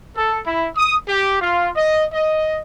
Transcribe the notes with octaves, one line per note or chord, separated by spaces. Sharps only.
A4
E4
D#6
G4
F4
D#5
D#5